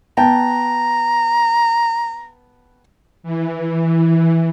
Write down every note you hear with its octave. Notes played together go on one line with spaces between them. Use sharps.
B3 G5 A5 A#5
E3